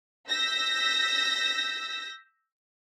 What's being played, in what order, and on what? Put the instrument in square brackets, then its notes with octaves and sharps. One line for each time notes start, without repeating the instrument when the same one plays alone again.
[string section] E6 G6 A#6 B6